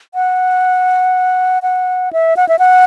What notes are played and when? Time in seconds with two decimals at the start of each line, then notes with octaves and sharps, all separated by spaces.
0.14 F#5
1.63 F#5
2.13 E5
2.37 F#5
2.49 E5
2.59 F#5